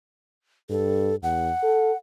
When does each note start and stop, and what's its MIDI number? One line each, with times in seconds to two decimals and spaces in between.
0.70 1.15 43
0.70 1.15 69
1.23 1.52 40
1.23 1.97 78
1.63 1.92 69